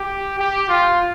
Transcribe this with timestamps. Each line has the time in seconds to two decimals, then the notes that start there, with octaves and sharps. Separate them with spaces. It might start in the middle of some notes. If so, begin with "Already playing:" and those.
Already playing: G4
0.39 G4
0.69 F4